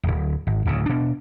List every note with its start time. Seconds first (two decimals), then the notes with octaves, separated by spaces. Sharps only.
0.03 D1 G#1
0.47 G#1
0.66 D1 D2 C#3
0.86 B2 D4